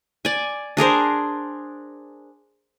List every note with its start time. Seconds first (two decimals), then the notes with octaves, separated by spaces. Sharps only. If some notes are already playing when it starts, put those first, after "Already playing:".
0.25 D5 G#5
0.77 D4 G#4 A#4 C5